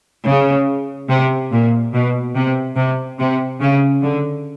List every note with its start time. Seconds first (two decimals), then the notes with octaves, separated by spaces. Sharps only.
0.25 C#3
1.09 C3
1.51 A#2
1.93 B2
2.35 C3
2.76 C3
3.19 C3
3.61 C#3
4.02 D3